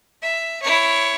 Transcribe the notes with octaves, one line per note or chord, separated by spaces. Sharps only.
E5
E4 C#5